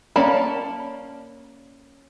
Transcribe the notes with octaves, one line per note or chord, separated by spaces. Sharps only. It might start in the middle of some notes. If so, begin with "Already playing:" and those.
A#3 C#4 D5 A5 B5